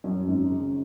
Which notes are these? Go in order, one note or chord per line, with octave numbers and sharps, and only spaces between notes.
F#2 C#4
C#4
G#1
C#3 C#4